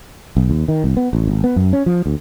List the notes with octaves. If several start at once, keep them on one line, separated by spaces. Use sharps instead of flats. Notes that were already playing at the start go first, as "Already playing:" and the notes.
B1
D#2
D#3
C2
B3
A1
G#1
B3
F#2
C#4
F3
D2